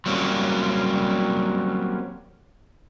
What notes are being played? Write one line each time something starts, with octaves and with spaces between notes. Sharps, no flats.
F#3 G3 A#3 C4 C#4